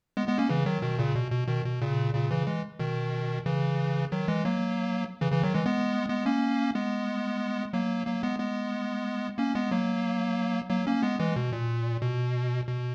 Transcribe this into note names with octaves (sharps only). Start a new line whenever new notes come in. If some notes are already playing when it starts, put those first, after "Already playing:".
G#3 B3
G#3 B3
A#3 C#4
C#3 E3
D#3 F#3
B2 D#3
A#2 C#3
B2
B2
B2 D#3
B2
A#2 C#3
A#2 C#3
C#3 E3
E3 G#3
B2 D#3
C#3 E3
D#3 F#3
E3 G#3
F#3 A#3
C#3 E3
C#3 E3
D#3 F#3
E3 G#3
G#3 B3
G#3 B3
A#3 C#4
G#3 B3
F#3 A#3
F#3 A#3
G#3 B3
G#3 B3
A#3 C#4
G#3 B3
F#3 A#3
F#3 A#3
A#3 C#4
G#3 B3
E3 G#3
B2
A#2
B2
B2